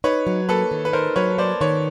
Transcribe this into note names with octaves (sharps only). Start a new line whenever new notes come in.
D#4 B4 C#5
F#3
A#3 A4 B4
D#3
B4
D#4 A#4 C5
F#3 B4 C#5
A#3 C5 D5
D#3 B4 C#5